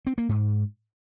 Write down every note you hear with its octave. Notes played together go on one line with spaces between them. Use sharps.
C4
A#3
G#2